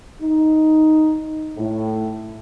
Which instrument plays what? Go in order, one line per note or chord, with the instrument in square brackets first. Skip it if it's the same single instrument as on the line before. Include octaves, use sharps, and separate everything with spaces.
[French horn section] D#4
A2